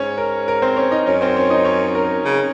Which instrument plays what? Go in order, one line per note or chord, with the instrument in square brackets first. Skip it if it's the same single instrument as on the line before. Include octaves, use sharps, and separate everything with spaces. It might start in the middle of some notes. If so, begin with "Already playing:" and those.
Already playing: [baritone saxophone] G#2 [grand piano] C#4 C#5
[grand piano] A#4
A#4
C4 C5
C#4 C#5
D#4 D#5
[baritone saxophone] F#2 [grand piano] C#4 C#5
[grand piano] C4 C5
C#4 C#5
D#4 D#5
C#4 C#5
A#4
[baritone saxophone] C#3